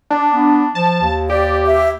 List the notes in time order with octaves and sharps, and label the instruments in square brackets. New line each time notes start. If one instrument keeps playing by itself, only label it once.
[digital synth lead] D4
[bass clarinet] B3
[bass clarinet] F3 [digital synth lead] A5
[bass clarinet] D#2
[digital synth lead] G4 [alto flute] D5
[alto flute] E5